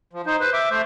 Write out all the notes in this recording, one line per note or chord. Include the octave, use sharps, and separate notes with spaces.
F3
D#4 C5
B4 C5
E5 D6
A3 C5